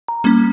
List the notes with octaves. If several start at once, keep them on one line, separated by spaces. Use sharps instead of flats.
A#5
G3 A#3 C#4